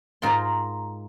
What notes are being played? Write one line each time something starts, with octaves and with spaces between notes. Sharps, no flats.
G#2 F4 A#4 C6